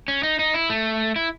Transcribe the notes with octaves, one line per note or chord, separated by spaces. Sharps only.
C#4
D#4
D#4
E4
A3
E4